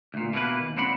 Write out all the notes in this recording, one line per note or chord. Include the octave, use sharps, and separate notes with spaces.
D2 A#2
B2 E3 A#3 B4
D#2
C#2 C4 D4 F#5 B5